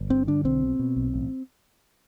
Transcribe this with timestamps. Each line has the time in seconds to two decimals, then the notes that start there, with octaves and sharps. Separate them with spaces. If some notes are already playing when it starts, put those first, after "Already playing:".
Already playing: G1
0.10 G2 C4
0.28 D3 D4
0.45 B1 C4
0.62 B2
0.79 B2
0.96 B1
1.14 A1